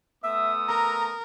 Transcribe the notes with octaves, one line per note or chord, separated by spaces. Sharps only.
A3 B3 E5 D#6 E6
A#4 A#5